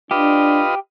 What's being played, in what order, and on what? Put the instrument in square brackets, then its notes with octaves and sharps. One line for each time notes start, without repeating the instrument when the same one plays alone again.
[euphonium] D4 [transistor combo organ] F4 B4 D#5 [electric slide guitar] G4